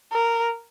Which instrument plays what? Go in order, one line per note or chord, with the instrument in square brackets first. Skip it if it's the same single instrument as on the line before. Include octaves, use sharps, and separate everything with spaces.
[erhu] A#4